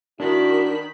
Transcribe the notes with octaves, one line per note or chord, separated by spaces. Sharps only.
D#3 D4 E4 F#4 B5